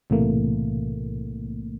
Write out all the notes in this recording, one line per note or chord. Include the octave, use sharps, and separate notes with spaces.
B1 A2 C3 E3 A3 A#3